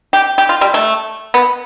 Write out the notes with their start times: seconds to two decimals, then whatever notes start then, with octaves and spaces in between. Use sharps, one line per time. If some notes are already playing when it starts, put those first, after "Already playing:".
0.13 G4
0.38 G4
0.49 F4
0.61 G3
0.74 A3
1.34 B3